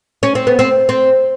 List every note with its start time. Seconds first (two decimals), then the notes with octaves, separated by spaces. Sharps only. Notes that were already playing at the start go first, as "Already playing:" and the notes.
0.23 C#4
0.35 C4
0.47 B3
0.59 C4
0.89 C4